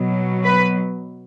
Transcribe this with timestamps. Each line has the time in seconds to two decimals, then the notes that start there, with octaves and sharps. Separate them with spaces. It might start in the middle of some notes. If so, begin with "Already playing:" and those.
Already playing: B2 F#3
0.44 B4